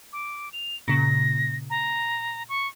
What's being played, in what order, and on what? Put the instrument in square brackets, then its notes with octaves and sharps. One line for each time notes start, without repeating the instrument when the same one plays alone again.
[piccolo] D6
F7
[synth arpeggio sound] A#2 C#3 [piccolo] A#6
[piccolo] A#5
C#6